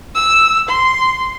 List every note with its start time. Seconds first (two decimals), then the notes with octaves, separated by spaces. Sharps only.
0.15 E6
0.69 C6